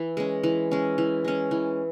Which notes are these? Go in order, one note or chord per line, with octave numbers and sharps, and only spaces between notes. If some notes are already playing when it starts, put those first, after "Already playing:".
Already playing: E3
G#3 C#4
E3
G#3 C#4
E3
G#3 C#4
E3